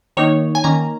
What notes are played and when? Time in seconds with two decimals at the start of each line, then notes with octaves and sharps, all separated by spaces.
0.17 D#3 A#3 D#4 C#5
0.55 G#5
0.64 D#3 A#3 C#4 A#5